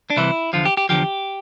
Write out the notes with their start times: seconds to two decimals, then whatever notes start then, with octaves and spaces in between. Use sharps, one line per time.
0.10 D4
0.17 C2 C3 E3 E4
0.53 E2 D3 F3 F4
0.65 G4
0.77 G4
0.89 E2 D3 F3 G4